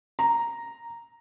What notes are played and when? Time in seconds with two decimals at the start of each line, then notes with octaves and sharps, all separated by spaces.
0.19 A#5